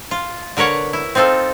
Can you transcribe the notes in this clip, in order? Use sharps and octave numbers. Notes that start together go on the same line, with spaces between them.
F4
D3 A#4 B4 C#5 F#5
E4
C4 D#4 F4 A4